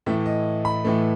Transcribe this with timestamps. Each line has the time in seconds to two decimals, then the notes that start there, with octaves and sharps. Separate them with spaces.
0.06 A2 E3 A3 E5
0.26 D#5
0.65 B5
0.85 A2 E3 A3